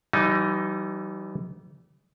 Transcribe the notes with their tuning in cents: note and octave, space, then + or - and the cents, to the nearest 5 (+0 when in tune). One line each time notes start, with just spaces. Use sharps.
E3 +20 G3 -40 D#4 +0